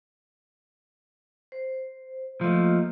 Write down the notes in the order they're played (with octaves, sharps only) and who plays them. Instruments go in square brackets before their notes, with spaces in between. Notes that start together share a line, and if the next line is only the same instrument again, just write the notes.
[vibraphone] C5
[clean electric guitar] F3 A3 [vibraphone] A#3 F4 D#5